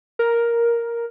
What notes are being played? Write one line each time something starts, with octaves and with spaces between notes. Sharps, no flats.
A#4